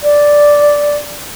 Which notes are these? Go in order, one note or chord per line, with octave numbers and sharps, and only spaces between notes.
D5